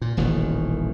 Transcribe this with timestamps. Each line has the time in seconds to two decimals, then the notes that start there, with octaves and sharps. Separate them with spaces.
0.02 A#2
0.17 D#1 A1 B2 D#3